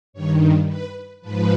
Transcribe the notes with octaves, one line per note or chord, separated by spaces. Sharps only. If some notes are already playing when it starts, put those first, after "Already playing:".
G2 D#3 C#5
B4
G#2 F3 B4